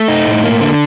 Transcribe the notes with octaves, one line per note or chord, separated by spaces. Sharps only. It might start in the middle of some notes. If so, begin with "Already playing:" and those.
Already playing: A3
D#4
A2
A#3
D3